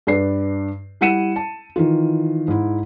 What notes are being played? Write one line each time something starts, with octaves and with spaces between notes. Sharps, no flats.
G2 B4 D5 C7
G3 E4 F#5 C#7 D#7 E7
A5
D#3 E3 F4
G#2 E4